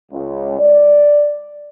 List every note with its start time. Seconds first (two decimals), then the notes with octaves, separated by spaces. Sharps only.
0.12 C#2
0.59 D5